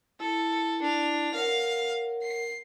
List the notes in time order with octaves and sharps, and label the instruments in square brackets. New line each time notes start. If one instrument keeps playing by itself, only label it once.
[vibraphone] E4 [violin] A4
[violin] D4 F7
[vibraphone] A#4 C#5 F#5 [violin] F5
[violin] C7